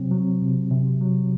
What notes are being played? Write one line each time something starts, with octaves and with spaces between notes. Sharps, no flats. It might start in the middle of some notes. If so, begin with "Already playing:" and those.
Already playing: C3 F#3 C4
F#3
C3
C3
F#3